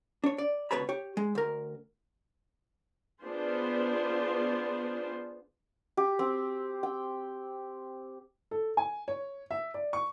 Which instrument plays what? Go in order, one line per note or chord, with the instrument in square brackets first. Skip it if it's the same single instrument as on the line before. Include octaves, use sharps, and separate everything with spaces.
[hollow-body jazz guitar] D4 C#5
D5
C#2 B2 B4 C#5 A5 B5
G4 C#5
G#3
D2 A#4
[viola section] B3 D4 F4 G#4 C5
[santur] G4
C4
G5
[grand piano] A4
G#5
C#5
E5
D5
C#6